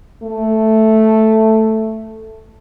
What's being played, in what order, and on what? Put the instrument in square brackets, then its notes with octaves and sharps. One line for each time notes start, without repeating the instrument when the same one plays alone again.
[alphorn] A3